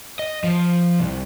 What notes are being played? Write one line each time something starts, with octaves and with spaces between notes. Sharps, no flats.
D#5
F3
C2